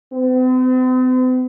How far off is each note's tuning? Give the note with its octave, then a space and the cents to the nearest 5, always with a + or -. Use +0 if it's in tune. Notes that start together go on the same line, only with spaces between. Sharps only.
C4 -45